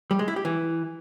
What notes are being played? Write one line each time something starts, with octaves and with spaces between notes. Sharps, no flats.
G3
G#3
E4
G4
E3